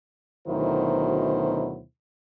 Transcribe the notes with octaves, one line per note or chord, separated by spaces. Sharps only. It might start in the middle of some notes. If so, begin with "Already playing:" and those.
D2 B2 D#3 F#3 E4 C5